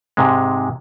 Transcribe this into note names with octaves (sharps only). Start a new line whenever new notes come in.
G#2 C3 G#3